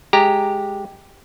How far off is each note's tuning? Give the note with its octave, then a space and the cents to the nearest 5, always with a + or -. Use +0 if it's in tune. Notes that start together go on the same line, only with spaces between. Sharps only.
G#3 +0 G4 +0 A#5 -5